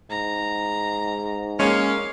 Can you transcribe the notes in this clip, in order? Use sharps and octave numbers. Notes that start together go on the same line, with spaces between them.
G#2 A#5
G#3 A#3 C#4 F5